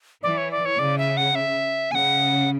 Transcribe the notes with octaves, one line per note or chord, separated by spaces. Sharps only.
E3 D5
C#5
D5
C#5
C#3 D5
E5
F#5
E5
C#3 F#5 G#5